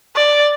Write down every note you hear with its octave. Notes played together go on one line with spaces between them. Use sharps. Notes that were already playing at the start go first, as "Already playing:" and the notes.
D5